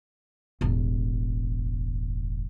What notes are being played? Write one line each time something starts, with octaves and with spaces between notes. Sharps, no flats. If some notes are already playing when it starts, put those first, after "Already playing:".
E1 A1